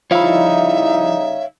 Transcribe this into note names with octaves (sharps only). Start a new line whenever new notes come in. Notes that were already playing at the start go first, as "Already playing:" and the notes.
C#3 F3 G3 D#4 E4 C#5 E5 F5